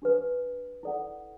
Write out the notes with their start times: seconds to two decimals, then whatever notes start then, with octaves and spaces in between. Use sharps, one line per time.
0.02 D4 G4 B4
0.83 E4 A4 D5 F#5